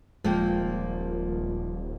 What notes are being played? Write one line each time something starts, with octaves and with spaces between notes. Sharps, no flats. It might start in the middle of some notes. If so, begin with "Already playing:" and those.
D#1 A#2 F3 G#3 A#3 G5